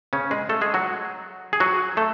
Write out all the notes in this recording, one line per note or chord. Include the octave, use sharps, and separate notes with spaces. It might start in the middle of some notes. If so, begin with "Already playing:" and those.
C#3 C#4
G#3 G#4
A3 A4
G#3 G#4
F#3 F#4
G#4
F#3 F#4
A3 A4